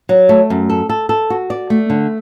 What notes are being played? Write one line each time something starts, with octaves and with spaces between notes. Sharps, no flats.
F#3
A3
F#2
A4
A4
A4
F#4
D5
A3
D3